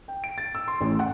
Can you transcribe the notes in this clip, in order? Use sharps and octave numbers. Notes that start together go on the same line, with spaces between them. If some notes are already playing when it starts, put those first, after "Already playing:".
G5
D7
A6
E6
C6
A1
F#5